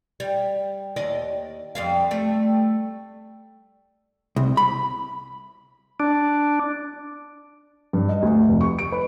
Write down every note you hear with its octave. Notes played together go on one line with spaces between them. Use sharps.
G3
D#2 D5 D#5
F2 G3 F5
G3 A3
C2
B5
D4
G2
D#5
D2
F1
C#6
D7
B4